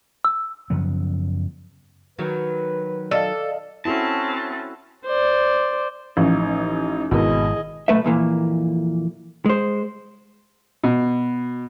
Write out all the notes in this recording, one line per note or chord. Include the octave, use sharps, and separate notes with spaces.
E6
F#2 C#3 F3 B3
D#3 F#3 B4
A4 D5 D#5 F5
C4 C#4 E4 F#4 A4 A5
C5 D5
A1 E3 F3 C#4 D#4
G#1 B2 E4 G#4 A#4 D#5
B1 F#2 A3 B4 E5
F2 A#2 E3 A#3
G#3 C5
B2